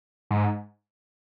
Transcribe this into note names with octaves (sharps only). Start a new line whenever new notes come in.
G#2